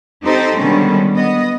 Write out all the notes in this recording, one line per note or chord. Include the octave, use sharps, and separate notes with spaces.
C4 D#4 G4 A4 C5
B2 D3 D#3 G3 G#3 C#4
B3 D#5